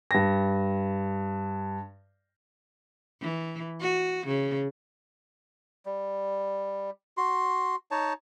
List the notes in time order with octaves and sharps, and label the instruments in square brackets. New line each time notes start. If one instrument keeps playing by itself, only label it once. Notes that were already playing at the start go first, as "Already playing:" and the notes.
[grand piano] G2 A#6
[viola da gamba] E3
F#4
C#3
[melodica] G3
F#4 C6
D#4 C#5 A5